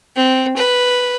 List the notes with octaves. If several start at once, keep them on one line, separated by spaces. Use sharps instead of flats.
C4
B4